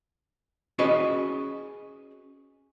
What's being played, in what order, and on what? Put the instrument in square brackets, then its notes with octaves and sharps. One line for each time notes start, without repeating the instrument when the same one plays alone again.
[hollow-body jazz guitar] C#4 F#4 G#4 B4 D#5